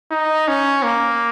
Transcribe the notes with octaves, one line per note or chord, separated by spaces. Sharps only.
D#4
C#4
A#3